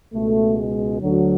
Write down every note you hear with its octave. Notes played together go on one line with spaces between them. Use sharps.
C#2 B2 A3
G#3
D2 D3 F#3